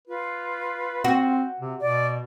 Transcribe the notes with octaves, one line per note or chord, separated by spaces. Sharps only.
F4 B4
C4 F#4
C3
B2 D5